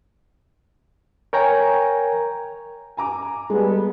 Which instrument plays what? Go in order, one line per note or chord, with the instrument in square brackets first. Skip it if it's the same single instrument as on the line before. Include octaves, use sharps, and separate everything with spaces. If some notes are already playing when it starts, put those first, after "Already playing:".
[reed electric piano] A#4 C#5 G5 G#5 A#5
[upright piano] G#5 A#5 D6
[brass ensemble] G3 B3 A4 [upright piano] G#3 [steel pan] G#4